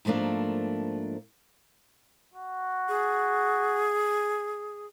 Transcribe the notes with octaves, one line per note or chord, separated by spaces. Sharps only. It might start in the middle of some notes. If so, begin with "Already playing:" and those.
G#2 F3 A3 A#3 D4
F#4
G#4